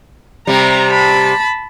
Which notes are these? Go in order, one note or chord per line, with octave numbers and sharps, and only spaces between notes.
C3 G3 A#5
A5 B5